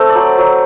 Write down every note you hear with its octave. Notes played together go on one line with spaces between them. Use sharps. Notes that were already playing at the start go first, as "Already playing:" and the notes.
Already playing: A3 C4 A5
D5
F#3 C5
F#3